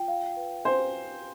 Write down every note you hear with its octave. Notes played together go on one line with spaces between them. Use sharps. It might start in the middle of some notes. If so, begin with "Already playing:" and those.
Already playing: F4 G5
F5
B4
C5 G#5